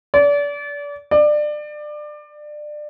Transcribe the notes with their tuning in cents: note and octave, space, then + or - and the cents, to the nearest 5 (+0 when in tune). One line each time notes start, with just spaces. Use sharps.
D5 -30
D5 +25